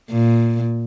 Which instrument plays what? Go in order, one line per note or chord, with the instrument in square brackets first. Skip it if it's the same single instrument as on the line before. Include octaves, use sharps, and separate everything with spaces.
[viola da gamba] A#2